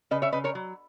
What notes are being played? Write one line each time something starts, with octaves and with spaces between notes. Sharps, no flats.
C#3 B4 D#5
C#5 E5
C#3 B4 D#5
A#4 C#5
F#3